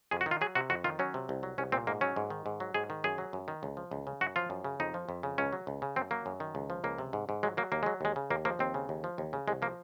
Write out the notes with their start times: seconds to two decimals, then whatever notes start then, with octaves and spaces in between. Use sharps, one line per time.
0.11 F2 G#4
0.21 F#4
0.26 D#3
0.31 F4
0.41 F#3 G#4
0.55 C3 F#4
0.70 F2 F#4
0.84 D#3 F4
0.99 F#3 C#4
1.14 C3
1.29 C2
1.43 F#3
1.58 C2 C#4
1.72 A#2 C4
1.87 G#2 A#3
2.01 F#3 C#4
2.16 G#2
2.30 D#3
2.46 G#2
2.60 F#3
2.74 G#2 G#4
2.90 D#3
3.04 F#2 G#4
3.18 F#3
3.33 F#2
3.48 D#3
3.63 C#2
3.77 F3
3.91 C#2
4.07 C#3
4.21 F#2 F#4
4.36 F3 F4
4.50 F#2
4.64 C#3
4.80 F2 D#4
4.94 F3
5.09 F2
5.23 C#3
5.38 C#2 C#4
5.53 F#3
5.67 C#2
5.82 C#3
5.96 F#2 C4
6.11 F#3 A#3
6.26 F#2
6.40 D#3
6.55 C#2
6.70 F3
6.84 C#2 A#3
6.98 C3
7.13 G#2
7.29 G#2
7.43 F#3 G#3
7.57 F#3 A#3
7.72 D#2 A#3
7.83 F#3 G#3
8.01 D#2 G#3
8.16 C#3
8.30 D#2 A#3
8.45 F3 A#3
8.59 D#2 C4
8.74 C#3
8.89 D#2
9.04 F3
9.18 D#2
9.33 C#3
9.48 C2 G#3
9.62 F3 A#3